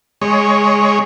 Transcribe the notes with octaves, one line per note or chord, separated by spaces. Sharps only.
G#3 C#5